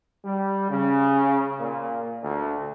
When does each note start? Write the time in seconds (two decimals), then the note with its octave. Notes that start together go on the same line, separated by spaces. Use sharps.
0.24 G3
0.70 C#3
1.59 A#2
2.23 D2